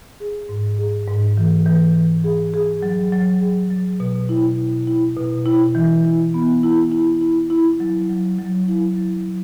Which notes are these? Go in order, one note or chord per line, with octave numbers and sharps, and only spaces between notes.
G#4
G#2
G#4
G#2
E3
E3
E3
G#4
G#4
F#3
F#3
G#4
F#3
B2
E4
B2
E4
B2
E4
E3
E4
B3
E4
E4
E4
E4
F#3
F#3
F#3
E4
F#3
F#3